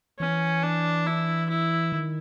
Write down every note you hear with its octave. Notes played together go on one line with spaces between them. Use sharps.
E3 C#4
D4
E4
E4
D#3